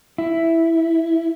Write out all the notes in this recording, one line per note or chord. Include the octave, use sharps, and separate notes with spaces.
E4